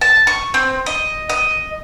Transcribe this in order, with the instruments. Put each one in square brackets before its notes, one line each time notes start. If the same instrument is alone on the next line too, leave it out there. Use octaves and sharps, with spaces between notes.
[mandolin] A5
C#6
C4
D#5
D#5